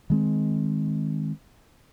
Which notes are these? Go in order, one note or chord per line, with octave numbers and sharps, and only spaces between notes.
D#3 G#3 C4